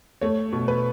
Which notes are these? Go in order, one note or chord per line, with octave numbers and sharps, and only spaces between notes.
A3 C#5
B2
B4